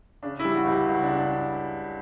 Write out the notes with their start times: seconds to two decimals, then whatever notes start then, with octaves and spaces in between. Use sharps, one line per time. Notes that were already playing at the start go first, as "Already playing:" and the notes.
0.23 C#3 D4
0.40 E4
0.44 G3
0.55 F#4
0.65 C#2
0.71 G4
0.87 C#2 F#4
1.03 D4
1.08 C#3
1.18 D4